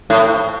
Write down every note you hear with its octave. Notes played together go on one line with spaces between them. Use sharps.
A2